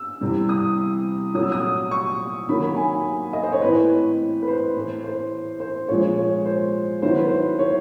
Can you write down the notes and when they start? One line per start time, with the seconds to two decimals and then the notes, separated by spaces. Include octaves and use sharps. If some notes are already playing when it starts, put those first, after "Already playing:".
Already playing: E6
0.21 C3 E3 G3 C4
0.49 D#6
1.35 A#2 F#3 A3 D#6
1.43 E6
1.52 D#6
1.91 C#6
2.49 D#3 F#3 A#3 B5
2.63 B5
2.76 G#5
3.33 D#5
3.43 C5
3.52 C#5
3.62 A2 E3 A3 C4 B4
4.42 B4
4.48 C5
4.75 A2 E3 A3
5.04 C5
5.60 C5
5.88 A#2 F3 G#3 C#5
6.17 C#5
6.46 C5
7.02 D#3 F#3 B3 E4 C5
7.16 B4
7.28 C5
7.59 C#5